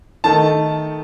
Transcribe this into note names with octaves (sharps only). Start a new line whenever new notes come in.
D#3 A3 D#4 A5